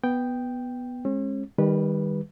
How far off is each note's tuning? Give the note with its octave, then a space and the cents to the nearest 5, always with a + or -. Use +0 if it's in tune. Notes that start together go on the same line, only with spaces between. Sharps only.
B3 +0 G5 +0
G#3 +0 C#4 -40
D#3 +0 G3 +25 B4 -15